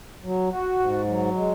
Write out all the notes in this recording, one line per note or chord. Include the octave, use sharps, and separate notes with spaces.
F#3
F#4
G#2
F#3
G#3